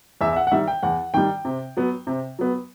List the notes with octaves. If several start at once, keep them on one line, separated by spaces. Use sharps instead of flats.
E2 E5
E5
F#5
F#5
D#3 G3 E5
G5
E2 F#5
D#3 G3 G5
C3
F#3 B3
C3
F#3 B3